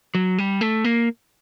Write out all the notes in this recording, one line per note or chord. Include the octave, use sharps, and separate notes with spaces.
F#3
G3
A3
A#3